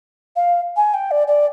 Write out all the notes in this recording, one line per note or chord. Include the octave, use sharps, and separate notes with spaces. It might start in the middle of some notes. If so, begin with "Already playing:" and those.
F5
G#5
G5
D5
D5